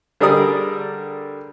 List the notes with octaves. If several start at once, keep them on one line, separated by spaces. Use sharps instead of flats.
D3 G3 G#4 A#4 D5 D#6